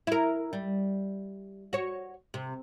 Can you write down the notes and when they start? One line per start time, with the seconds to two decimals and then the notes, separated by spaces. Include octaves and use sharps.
0.07 E4 A#4
0.53 G3
1.73 F#4 C#5
2.34 C3